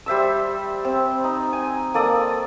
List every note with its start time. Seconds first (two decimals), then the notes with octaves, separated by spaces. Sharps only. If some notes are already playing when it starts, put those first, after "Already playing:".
0.06 G3 C5 E5 E6
0.85 C4
1.24 D#4
1.53 G#5
1.94 A#3 A4 D5 D#6